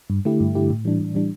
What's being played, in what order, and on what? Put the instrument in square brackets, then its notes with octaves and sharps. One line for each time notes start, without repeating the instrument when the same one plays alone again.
[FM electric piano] G2
D3 A3 E4 G4
G2
D3 A3 E4 G4
A2
E3 G3 D4
A2
E3 G3 D4